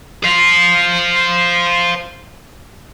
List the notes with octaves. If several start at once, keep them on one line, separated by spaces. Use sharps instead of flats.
C5 F5